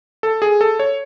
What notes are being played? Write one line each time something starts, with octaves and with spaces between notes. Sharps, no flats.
A4
G#4
A4
C#5